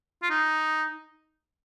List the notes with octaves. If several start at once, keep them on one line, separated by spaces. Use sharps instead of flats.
F4
D#4